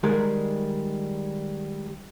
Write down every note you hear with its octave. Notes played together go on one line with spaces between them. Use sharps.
D#3 G3 G#3 G#4 A#4